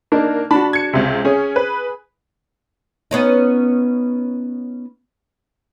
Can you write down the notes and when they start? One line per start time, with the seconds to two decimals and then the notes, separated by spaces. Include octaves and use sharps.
0.12 A#3 D4 D#4
0.51 D4 F#4 A5 B5
0.73 G#6 C#7
0.93 C#2 C3
1.25 C#4 G#4
1.56 B4
3.11 B3 C#4 D#4